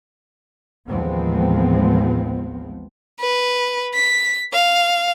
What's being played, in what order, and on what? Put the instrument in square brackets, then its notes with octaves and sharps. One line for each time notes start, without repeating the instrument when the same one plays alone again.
[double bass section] A1 D#2 F3 G#3 B3 C4
[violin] B4
B6
F5